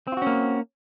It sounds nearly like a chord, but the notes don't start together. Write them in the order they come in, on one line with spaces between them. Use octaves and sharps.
C4 F4 F#4 C#4 A#3